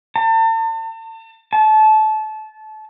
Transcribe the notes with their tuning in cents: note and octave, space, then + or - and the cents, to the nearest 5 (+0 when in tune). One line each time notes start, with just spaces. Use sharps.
A5 +40
A5 -25